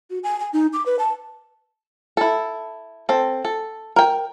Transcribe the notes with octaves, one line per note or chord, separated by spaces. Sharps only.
F#4
G#5
G#5
D#4
D6
B4
A5
E4 A4
C4 A4
A4
A#4 G5